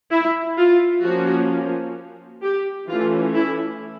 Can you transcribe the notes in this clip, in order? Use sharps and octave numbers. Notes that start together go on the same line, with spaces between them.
E4
F4
F3 A#3 C#4 F#4
G4
E3 A3 C#4 F4
E4